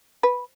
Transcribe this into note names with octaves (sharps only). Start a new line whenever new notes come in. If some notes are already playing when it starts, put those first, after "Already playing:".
B4